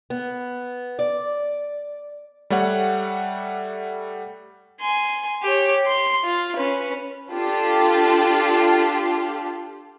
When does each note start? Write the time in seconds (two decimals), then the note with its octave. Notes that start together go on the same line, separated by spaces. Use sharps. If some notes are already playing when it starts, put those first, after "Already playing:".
0.10 B3
0.99 D5
2.50 G3 A3 C#5 F#5
4.80 G#5 C6
5.43 G4 C#5
5.87 C6
6.24 F4
6.54 C#4 B4
7.31 D4 F4 G4 A4